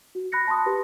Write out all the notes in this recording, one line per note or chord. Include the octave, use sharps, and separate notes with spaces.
F#4
B5 F#6 A#6 C#7
A5 B5 C6 D#6
G4 B4